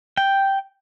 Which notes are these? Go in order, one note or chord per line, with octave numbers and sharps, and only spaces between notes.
G5